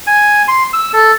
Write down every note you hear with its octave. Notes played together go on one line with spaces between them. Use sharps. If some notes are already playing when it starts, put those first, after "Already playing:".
G#5
C6
E6
A4